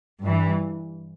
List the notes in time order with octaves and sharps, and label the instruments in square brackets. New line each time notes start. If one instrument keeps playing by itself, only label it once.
[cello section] G2 E3